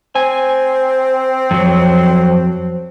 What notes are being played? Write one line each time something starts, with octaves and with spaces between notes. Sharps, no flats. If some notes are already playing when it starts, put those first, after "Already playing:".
C4 G#5
F2 F#3